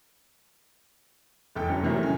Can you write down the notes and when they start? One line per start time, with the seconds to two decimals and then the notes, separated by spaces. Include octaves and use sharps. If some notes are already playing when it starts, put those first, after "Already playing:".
1.55 F1 E2 A4 G5
1.69 F#2 D3 F#3
1.83 A2 C3 D#3 E3 F#3 G3
2.03 C#4